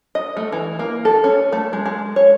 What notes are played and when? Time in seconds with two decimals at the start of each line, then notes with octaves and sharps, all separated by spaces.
0.15 D#5
0.37 A3
0.52 E3
0.79 A#3
1.05 A4
1.24 C#4
1.52 A3
1.73 G#3
1.86 G#3
2.16 C#5